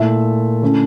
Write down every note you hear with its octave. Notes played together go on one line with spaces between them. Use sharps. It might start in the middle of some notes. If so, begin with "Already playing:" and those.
Already playing: A#2 A3 E4 E5
D3 A3 C#4 E4